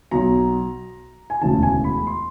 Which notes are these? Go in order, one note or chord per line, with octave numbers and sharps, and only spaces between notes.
B1 B2 A#5
G#5
E1 D2 C#3 E3 A5
G#5
B5
C6